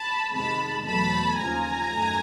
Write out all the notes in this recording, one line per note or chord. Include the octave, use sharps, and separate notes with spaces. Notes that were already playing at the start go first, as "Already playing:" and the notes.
Already playing: A5 B5
F2 C3 D#3 G#3 A5 B5
E2 B2 F#3 A3 A5 B5
D#2 C#3 F3 G#5 A#5
F#2 D#3 F#3 A3